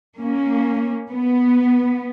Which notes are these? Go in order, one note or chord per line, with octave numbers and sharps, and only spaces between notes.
A#3 C#4
B3